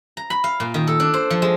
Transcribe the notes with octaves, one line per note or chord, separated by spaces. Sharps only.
A#5
B5
F5
A#2
D#3
A4
D4
C5
F3
G#3